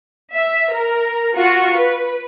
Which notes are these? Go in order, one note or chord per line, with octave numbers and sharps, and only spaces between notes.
E5
A#4
F4 F#4 C#6
B4